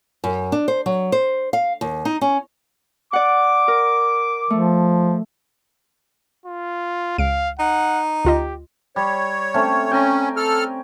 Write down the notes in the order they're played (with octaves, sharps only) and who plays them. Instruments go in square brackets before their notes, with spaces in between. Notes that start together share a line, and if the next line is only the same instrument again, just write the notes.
[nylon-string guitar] F#2
D4
C5
F#3
C5
F5
D#2
D#4
C#4
[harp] D5 F#5 [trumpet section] D6
[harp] A#4
[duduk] F3 [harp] A3
[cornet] F4
[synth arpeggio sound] C#2 D7 [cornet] F5
[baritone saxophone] D#4 [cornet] F#5
[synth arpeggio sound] D2 F4 D#5 [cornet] G4
[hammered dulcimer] G3 [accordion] C#5
[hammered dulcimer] A3 C4 C#4
[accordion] C#4 [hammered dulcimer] G5 G#5 A#5
[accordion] A4 F6